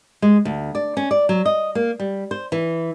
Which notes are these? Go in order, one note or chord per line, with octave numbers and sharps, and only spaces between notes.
G#3
D2
D5
C#4
D5
F#3
D#5
A#3
G3
C5
E3